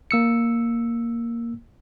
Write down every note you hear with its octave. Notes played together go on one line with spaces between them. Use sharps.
A#3 E6 C#7